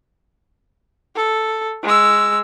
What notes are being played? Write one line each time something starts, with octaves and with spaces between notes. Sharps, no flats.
A4
G#3 E6